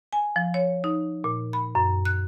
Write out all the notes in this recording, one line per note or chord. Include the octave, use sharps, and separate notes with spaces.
G#5
F3
C#5
D#4
A#2
B5
F#2
F#6